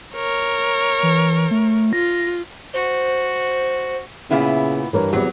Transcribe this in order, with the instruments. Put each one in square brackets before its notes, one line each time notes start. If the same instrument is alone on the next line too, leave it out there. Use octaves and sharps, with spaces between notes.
[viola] A#4 C#5
[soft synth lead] E3
A3
[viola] F4 [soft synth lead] A#6
[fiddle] F#4 [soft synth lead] C5
[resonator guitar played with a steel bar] A#2 B3 E4 [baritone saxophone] C#3
[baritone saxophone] G2 [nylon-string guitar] E3 A#4 C#5
[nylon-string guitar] E2 C3 G3 [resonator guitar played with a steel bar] F#3